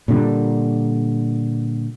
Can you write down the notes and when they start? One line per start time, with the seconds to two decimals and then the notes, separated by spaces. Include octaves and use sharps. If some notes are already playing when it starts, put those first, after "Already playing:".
0.08 A#2 D3 G3